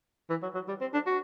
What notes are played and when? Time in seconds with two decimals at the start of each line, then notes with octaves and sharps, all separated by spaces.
0.30 E3
0.43 F#3
0.55 F#3
0.68 G3
0.81 C4
0.94 D4
1.06 F#4